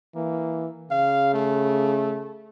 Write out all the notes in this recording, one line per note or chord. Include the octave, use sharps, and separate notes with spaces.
E3 A#3
C#3 F5
A3